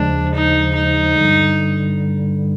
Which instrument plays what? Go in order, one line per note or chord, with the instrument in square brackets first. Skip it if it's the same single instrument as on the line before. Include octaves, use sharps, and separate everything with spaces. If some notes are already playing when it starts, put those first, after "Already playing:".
Already playing: [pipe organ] D#2 C#3 F3 G#3 [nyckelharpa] D4
[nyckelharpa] D#4
D#4
[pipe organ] G2 D3 G3